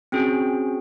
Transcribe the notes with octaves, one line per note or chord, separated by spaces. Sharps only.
C4 C#4 F#4 G#4